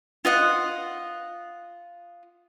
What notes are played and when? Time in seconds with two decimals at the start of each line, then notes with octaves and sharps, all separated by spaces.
0.25 F4 D#5 F#5